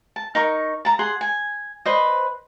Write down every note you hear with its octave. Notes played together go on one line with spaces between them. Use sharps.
A5
D#4 A#4 C#6
A5 A#5
G#4 F#5 C6
G#5
B4 C5 D#5